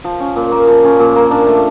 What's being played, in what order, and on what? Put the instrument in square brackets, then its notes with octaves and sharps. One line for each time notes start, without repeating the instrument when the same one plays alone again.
[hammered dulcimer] F3
C#4
A#2
A#3
F3
C#4
A#2
A#3
D4
A3